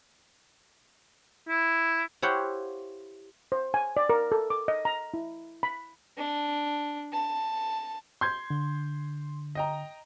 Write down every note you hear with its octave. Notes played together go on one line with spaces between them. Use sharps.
E4
E4 G4 C5 C#5 F5 F#5
C5
G#5
D5
A#4
A4
D6
D#5
A#5
E4
B5
D4
A5
C6 G6 G#6
D3
D#5 G5 A#5